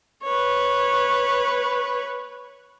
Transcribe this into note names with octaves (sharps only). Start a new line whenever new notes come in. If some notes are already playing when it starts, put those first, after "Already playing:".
B4 C#5